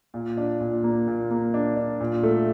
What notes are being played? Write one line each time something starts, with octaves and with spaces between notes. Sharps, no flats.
A#2
D4
A#2
A#3
A#2
A#3
D4
D4
A#2
A3